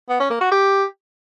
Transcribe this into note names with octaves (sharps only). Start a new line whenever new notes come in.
B3
C#4
A#3
F#4
G4